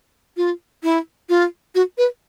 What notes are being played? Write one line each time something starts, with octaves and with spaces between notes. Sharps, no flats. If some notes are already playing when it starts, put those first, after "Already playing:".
F4
E4
F4
F#4
B4